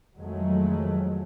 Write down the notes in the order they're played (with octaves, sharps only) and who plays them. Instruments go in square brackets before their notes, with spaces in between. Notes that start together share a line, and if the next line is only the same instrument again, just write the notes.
[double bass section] F2 D#3 F#3 G#3 A3